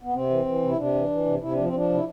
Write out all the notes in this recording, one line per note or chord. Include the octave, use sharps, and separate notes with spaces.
B3
C3 C4
E3
E3
C3 E4
C3 D4
E3
E3
C3
C3 E4
F3 D4
C4
F3 D4
C3 E4